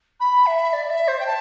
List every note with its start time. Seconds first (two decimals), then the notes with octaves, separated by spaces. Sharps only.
0.20 B5
0.46 E5
0.73 D5
0.86 D5
0.90 E5
1.07 C5
1.19 G5
1.26 A5